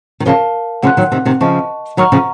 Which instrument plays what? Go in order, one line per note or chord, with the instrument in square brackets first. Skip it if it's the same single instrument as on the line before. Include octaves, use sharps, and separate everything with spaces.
[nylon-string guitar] D#3
[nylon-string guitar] C#3 F3 [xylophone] A#4 F5 A5
[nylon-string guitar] C#3 F3 [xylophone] F#5 C6 F#6
[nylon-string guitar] D#3 F#3
C3 D#3
C3 D#3
[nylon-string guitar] C#3 F3 [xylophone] D#5 A5 C#6
[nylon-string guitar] D#3 F#3 [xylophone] F#5 A#5 C#6 F6
[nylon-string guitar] C#3 F3